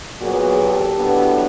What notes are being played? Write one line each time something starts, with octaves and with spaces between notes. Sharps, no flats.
A#2 F#3 B3 F#4 G#4
G4 A4
A2 F#3 B3 D4